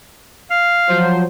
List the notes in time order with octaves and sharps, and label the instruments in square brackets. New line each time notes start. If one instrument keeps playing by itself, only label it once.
[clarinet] F5
[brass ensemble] F3 F#3 C5